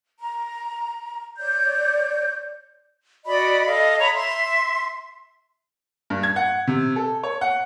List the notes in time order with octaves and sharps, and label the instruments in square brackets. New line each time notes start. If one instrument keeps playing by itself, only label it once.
[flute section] A#5
C#5 D5 G6
F#4 D5 D#5 B5
A4 D#5 F5
C#5 A#5 B5
E5 C6
[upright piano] G2
G#6
F#5
C3
A4
C#5
F#5